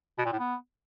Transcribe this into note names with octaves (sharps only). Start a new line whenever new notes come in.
B2
A#2
A2
B3